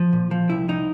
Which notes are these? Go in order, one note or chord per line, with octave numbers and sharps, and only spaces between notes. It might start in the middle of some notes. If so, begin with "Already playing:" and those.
Already playing: F3
A#2
F3
C2 E4
C2 D#4